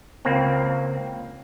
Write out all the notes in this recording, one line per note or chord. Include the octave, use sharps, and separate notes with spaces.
C#2 A#3 C4